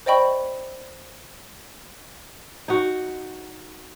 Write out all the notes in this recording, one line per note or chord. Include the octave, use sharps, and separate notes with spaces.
C5 D5 D#5 G5 B5 C#6
D#4 F#4